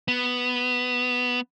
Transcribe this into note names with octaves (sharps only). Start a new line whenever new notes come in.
B3